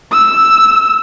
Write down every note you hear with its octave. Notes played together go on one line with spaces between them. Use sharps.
E6